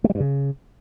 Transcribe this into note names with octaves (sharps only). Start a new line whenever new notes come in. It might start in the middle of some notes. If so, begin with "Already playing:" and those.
A3
G3
G2
C#3